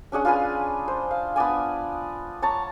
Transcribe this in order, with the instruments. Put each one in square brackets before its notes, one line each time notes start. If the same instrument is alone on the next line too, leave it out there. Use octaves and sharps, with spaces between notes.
[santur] C#4 D4 G#4 F#5
F4 G#4 B4 G#5
C5
F5
B3 D4 D5 G#5
C#5 A5 A#5